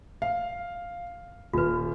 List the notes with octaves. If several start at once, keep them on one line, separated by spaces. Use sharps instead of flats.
F5
D#1 F4 B4